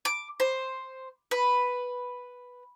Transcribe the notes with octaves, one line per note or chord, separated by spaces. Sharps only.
D6
C5
B4